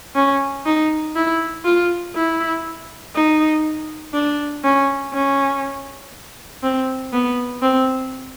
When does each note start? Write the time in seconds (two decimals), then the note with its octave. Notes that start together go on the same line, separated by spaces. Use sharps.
0.15 C#4
0.65 D#4
1.16 E4
1.65 F4
2.15 E4
3.15 D#4
4.14 D4
4.64 C#4
5.14 C#4
6.63 C4
7.13 B3
7.62 C4